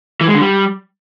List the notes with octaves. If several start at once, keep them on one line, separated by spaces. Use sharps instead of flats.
E3
G#3
D3
G3